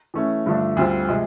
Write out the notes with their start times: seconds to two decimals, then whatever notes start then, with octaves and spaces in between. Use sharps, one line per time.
0.14 E3 A3 C#4 E4
0.46 G2 D3 F3 A3 D4
0.77 D2 D3 G3 C4 F4
1.09 C3 F3 G#3